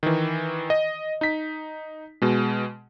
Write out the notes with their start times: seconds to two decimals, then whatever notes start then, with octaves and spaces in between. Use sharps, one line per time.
0.03 D#3 E3
0.70 D#5
1.21 D#4 B6
2.22 B2 G#3